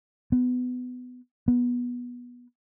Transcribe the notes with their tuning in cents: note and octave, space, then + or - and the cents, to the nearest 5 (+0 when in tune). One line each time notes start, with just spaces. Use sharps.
B3 +20
B3 -15